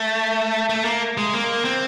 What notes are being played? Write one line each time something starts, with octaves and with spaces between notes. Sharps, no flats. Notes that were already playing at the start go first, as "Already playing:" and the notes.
Already playing: A3
A3
A#3
G#3
A#3
C4